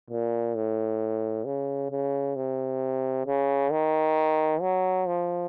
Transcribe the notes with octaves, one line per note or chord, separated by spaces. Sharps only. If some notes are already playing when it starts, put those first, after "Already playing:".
A#2
A2
C#3
C#3
C3
C#3
D#3
F#3
F3